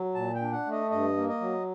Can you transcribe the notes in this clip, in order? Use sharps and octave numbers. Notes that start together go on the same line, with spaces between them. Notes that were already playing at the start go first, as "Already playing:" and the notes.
Already playing: F#3
A#2 A5
G5
D4
F#5
A3
D#5
G2 D#5
A#3
D#5
F#3